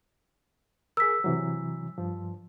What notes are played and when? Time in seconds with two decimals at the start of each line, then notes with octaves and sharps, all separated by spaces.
0.97 G#4 A#4 E6 B6
1.24 C3 E3 F#3
1.98 G2 F3